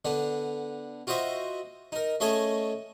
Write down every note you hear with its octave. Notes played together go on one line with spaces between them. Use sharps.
D3 B3 D4
F4 F#4 C5 D#5 E5
D#4 A#4
A3 C#4 G#4 D#5 G#5 A5